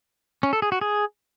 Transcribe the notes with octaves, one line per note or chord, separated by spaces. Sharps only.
C#4
A4
G#4
F#4
G#4